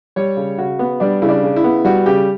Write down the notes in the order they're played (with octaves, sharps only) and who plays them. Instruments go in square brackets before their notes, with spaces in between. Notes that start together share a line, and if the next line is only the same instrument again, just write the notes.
[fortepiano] G3 C#5
C#3
C#3 F#4
B3
G3 D4
C#3 E4
D4
C#3
E4
B3
G3 F#4
C#3 G4